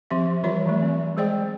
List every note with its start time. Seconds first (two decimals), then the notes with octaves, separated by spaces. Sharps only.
0.11 F3 C4 G4 E5
0.43 E3 G3 F4 C#5 E5
0.65 E3 F#3 A3
0.82 C4
1.17 G#3 G#4 C5 D5 G5